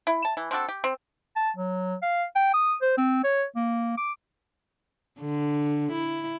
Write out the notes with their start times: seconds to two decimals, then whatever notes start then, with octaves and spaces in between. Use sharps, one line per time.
0.07 E4
0.25 A5
0.37 E3
0.51 C4 D4 F#4 A4
0.69 G4
0.84 C4
1.36 A5
1.57 F#3
2.02 F5
2.35 G5
2.54 D#6
2.82 C5
2.98 C4
3.24 C#5
3.56 A#3
3.97 D6
5.19 D3
5.92 E4